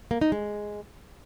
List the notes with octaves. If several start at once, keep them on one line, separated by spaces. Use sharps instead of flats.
A#3
D#4
G#3